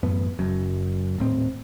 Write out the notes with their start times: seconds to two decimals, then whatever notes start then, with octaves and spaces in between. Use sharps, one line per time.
0.03 A1 F#2 B3
0.39 F#1 F#2
1.18 D#1 A2 C4